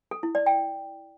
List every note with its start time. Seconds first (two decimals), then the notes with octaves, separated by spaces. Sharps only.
0.11 A4
0.23 E4
0.35 D5
0.46 G5